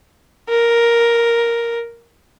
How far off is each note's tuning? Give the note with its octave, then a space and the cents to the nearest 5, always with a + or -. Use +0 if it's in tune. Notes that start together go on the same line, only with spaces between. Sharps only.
A#4 +5